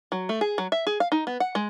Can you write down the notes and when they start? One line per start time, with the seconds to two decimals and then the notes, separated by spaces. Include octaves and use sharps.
0.12 F#3
0.29 A3
0.41 G#4
0.58 F#3
0.72 E5
0.87 G#4
1.00 F5
1.12 D#4
1.27 B3
1.40 F#5
1.55 G#3